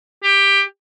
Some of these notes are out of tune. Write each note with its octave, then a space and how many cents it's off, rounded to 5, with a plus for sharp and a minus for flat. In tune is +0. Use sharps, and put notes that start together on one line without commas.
G4 +15